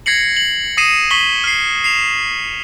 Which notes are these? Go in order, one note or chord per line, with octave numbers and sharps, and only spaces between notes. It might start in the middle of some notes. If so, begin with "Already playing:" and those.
G#6 A#6 C7 C#7 F#7
F#7
D#6 A#6 C7 C#7 D#7 E7
C#6 B6 D#7 F#7 G7
F6 C7
C7 E7 F7